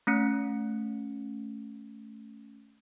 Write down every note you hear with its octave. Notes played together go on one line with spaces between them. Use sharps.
A3 C#4 C#7